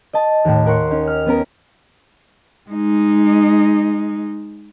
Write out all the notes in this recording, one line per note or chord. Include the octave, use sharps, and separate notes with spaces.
D#5 A5
D#2 A2
A#4 F#5 C6 C#6
C#4 D#4
F6
B3 C#4 A#4
G#3 D#4